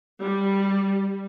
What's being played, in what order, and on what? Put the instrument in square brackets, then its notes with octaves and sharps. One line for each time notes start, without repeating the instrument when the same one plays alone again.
[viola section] G3